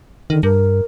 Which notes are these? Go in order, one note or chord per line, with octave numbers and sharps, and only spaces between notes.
D3 D#3
G2 A#4